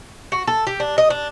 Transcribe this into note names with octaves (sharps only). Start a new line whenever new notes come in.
F#4
A4
G4
D4
D#5
D4